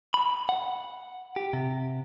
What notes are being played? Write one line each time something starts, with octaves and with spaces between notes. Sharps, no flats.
B5
F#5
G4
C3